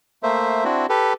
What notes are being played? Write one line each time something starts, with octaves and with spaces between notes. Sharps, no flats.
A3 A#3 C5 E5
C4 D4 E4 F#4
G4 A4 B4